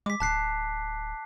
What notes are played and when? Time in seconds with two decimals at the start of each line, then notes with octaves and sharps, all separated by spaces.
0.06 G#3 D6 B6
0.20 D1 A5 F#6 C7